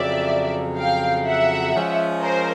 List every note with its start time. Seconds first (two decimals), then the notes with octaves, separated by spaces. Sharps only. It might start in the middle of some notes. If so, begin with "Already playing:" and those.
Already playing: F2 C#3 F#3 D5 E5
0.77 F5 G5
1.25 E5 F#5
1.74 F3 G#3 C#4
2.21 A#4 C5